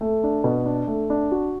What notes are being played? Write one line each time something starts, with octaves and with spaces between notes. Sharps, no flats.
A3
D4
B2
D4
A3
D4
F#4